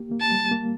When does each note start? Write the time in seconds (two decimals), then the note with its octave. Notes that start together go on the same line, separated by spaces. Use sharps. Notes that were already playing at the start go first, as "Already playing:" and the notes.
Already playing: A#3 G4
0.12 A#3
0.21 A5
0.32 G3
0.51 A#3